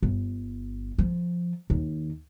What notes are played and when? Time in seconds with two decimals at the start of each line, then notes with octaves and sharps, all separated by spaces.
0.03 G1
0.98 F3
1.70 D#2